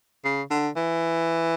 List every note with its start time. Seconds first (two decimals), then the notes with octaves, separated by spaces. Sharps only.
0.24 C#3
0.50 D3
0.76 E3